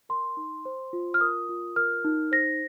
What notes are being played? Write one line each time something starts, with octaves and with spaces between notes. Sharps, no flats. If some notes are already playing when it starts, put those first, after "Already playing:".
A#4 C6
D#4
C5
F4
F6
A#4 D#6
F4
A#4 F6
D#4
C5 A#6